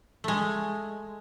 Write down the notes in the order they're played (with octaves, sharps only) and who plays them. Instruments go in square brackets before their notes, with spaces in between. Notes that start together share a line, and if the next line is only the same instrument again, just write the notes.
[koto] G#3 A3